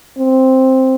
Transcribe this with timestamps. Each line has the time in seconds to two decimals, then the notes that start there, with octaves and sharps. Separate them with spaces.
0.19 C4